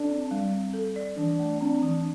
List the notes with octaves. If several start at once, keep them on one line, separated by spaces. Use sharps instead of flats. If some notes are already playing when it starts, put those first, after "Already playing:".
Already playing: D4 A4
C4
G3
C4
A4
D5
E3 D4
A3
C4 D4
E3